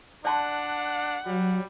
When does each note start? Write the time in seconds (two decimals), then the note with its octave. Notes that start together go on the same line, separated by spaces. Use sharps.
0.25 D4 D5 F#5 A5 C6
1.26 F#3 G3